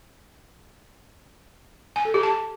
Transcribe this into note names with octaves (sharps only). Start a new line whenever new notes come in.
G#5
A4
G4
A5